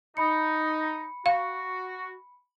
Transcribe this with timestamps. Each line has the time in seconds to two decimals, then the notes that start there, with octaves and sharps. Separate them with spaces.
0.17 D#4 B5 C#7
1.26 F#4 F5